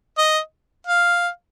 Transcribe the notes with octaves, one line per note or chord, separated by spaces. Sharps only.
D#5
F5